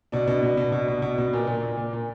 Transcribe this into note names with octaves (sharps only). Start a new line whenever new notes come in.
B2 D4
B2
B2
B2
B2
B2
B2
B2
A#2
A#2
A#2
A#2
A#2